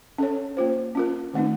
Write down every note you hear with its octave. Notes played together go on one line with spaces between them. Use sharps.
C#4 A4 C#5
A#3 F4 C5
C#4 F4 A#4
D#3 A3 C4 D#4